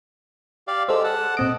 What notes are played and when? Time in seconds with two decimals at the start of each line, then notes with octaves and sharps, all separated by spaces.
0.68 G4 D5 F5
0.89 G#3 G4 A4 C5 E6
1.04 F#5 A5
1.37 A#2 C4 D#5 D7